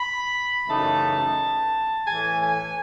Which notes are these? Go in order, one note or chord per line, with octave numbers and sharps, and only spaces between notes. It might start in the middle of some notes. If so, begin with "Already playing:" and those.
Already playing: B5
F#2 C#3 E3 A3 D#4 A5
A2 E3 A3 G#5
G#5